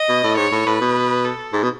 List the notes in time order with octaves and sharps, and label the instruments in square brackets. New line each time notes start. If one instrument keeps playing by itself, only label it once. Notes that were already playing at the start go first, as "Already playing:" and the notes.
Already playing: [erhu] D#5
[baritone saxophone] B2
A2
[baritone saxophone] G#2 [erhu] C#5
[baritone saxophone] A2
[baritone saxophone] A2 [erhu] B4
[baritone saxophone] B2
[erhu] A4
[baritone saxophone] G#2
B2